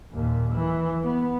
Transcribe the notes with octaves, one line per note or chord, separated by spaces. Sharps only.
D#2 A#2
E3
B3